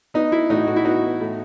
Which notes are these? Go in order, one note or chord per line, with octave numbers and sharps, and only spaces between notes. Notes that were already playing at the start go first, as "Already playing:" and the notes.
B3 D#4
B3 E4
A2 D#4 F#4
A2 F#4
E4
B3 D#4 F#4
B3
A2